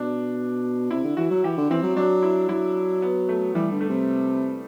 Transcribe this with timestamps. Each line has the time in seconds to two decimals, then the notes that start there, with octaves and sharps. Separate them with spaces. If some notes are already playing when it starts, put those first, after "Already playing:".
Already playing: B2 D4
0.91 C3 E4
1.04 D3
1.17 E3 F#4
1.31 F#3
1.44 E3 G4
1.57 D3
1.70 E3 C4
1.83 F#3
1.96 F#3 D4
2.23 E4
2.49 F#3 E4
3.02 B3
3.29 A3
3.55 E3 G3
3.72 D3
3.81 A3
3.90 C3